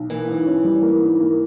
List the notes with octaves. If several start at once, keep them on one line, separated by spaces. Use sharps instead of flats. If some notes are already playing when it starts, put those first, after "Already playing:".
Already playing: B1
E3 A#3
G#2
C#4
G3
A#3
G#2
A#3